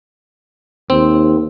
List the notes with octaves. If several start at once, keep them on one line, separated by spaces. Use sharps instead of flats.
D#2 C4